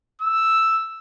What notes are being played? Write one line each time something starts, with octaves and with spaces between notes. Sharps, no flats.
E6